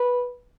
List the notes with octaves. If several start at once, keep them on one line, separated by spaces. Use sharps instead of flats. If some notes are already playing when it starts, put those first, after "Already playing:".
Already playing: B4